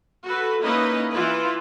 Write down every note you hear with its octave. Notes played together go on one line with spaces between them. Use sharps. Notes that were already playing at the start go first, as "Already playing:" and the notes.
F#4 A4 B4
A#3 C#4 D#4 E4 B4 D#5
E3 F4 B4